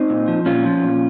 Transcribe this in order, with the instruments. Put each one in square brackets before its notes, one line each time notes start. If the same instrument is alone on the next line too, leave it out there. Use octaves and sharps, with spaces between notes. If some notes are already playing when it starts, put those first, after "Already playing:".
Already playing: [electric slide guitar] C4 D#4
A#2
F3
A#2 C#4 F4
F3
A#2